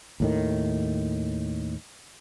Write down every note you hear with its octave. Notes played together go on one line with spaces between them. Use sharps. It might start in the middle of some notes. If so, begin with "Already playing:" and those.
D#2 A2 D#3